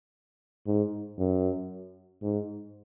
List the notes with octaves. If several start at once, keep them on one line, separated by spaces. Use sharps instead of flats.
G#2
F#2
G#2